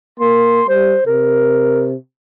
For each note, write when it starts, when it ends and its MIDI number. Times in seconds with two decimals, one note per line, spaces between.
0.20 0.61 58
0.20 0.65 84
0.68 0.97 55
0.68 1.02 72
1.07 1.94 48
1.07 1.87 70